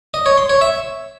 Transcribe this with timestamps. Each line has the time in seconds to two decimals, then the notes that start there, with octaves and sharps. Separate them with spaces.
0.14 D#5
0.26 C#5
0.38 C6
0.49 C#5
0.61 E5